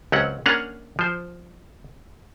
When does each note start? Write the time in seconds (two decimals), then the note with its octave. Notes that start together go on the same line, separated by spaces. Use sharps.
0.12 C#2 F#3 C4 C#4 F#5
0.46 A#3 C#4 D4 G#4 F#5 A#5
0.99 F3 C5